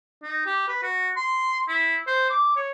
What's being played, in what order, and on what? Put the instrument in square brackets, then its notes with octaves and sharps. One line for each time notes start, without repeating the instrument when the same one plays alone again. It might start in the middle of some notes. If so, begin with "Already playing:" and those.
[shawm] D#4
G4
B4
F#4
C6
E4
C5
D6
C#5